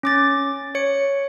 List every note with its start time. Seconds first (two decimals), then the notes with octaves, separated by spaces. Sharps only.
0.03 C#4 D6 A6
0.75 C#5 C#7